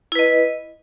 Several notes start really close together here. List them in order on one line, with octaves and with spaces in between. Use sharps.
E4 B4 D#5